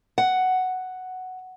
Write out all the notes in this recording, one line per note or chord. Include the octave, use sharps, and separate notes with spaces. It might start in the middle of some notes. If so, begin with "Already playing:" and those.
F#5